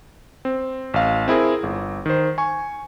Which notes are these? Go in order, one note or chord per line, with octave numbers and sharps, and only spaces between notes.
C4
A1 F5
C4 E4 G#4 A#4
G1
D#3 C5
G#5 C#6